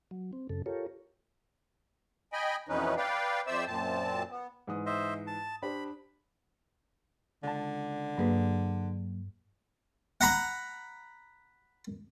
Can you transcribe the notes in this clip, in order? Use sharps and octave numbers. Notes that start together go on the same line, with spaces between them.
F#3
C4
F#2 C#3 A4
F4 G4 A4 A#4 C#5
D#5 G5 G#5 B5
F2 B2 E3 C#4 D#4 B4
B4 D5 F5 G5
F2 C5 D5 E5 E6
F#2 A#2 C4 A5
B3
G#2 E3 D#6
C5 D#5 E5
A5
D4 G4 C5 B5
C#2 D3 A5
G2 F#3 A#3 G#4 B4
F#5 A#5 B5